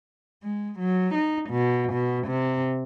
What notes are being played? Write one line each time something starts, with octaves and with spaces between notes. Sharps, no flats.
G#3
F#3
D#4
B2
B2
C3